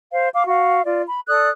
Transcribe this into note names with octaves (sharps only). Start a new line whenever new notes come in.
C5 F5
F5 D6
F#4 F5
F4 D5
B5
A4 D5 D#6 F#6